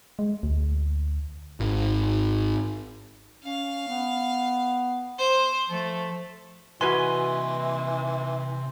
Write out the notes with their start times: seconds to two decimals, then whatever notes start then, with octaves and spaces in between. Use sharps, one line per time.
0.19 G#3
0.43 D2
1.60 G#1
3.44 C#4 F5
3.89 B3
5.19 C5
5.70 F3 A3
6.81 C3 E3 F#4 B4 D#5 G#5 C6